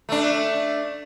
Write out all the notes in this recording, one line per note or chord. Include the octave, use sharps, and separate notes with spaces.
A3 D4